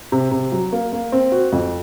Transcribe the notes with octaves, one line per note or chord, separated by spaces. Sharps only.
C3
C3
F#3
A#3
A#3
C4
F#4
F2